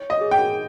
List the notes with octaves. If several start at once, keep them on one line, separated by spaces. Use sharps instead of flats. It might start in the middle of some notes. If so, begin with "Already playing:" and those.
Already playing: C#5
D#5
G#4
G5